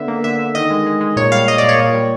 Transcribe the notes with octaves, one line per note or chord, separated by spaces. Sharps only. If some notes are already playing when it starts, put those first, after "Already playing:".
Already playing: D3 B3 E5
A#3
D3 E5
D3
D#3 D#5
G#3
G#3
G#3
A#2 C#5
G3 F5
G3 D#5
D5
A#2
C#5
A#2
G3